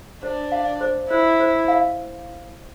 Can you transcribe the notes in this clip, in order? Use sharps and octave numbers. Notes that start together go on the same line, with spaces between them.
D4 C5
F5
C5
E4 C5
C5
F5